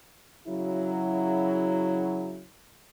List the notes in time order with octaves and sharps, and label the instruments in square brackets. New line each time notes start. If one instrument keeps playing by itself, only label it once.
[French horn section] C#3 F#3 E4